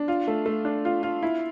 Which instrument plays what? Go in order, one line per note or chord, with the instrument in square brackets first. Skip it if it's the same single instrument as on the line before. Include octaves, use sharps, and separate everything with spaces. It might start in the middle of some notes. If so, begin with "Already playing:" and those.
Already playing: [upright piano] D4
F4
A3
A3
D4
F4
F4
E4